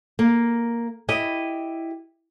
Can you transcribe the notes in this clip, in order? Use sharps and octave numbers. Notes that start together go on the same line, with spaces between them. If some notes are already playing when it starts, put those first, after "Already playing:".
A#3
E4 G4 D#5